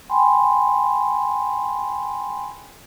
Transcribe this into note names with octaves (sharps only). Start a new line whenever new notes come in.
G5 G#5 B5 C6